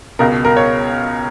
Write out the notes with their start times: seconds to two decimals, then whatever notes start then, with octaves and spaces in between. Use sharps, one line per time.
0.19 C#2 B2 A#4
0.45 A#4
0.57 C#5